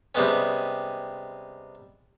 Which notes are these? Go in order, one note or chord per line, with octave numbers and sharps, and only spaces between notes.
C3 G3 G#3 B3 C#4